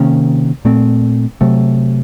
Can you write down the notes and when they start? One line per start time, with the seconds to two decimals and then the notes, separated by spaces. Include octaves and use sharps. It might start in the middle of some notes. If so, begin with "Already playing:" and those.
Already playing: C3 D#3 A#3 C#4
0.65 A#2 A3 C4
1.41 C3 F#3 A3